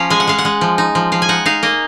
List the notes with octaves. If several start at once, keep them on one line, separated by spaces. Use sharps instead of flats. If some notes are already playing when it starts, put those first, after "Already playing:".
Already playing: F3 C#4 F5 A#5
G#3 G#5
F#5
G#3 F5
F#5
G#3
F3
D#4
F3
F3 F5
G#5
D#4 F#5
D#4 F5
A#3 D#5